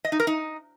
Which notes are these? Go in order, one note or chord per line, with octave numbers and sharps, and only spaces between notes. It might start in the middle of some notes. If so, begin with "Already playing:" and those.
D#5
D#4
A#4
D#4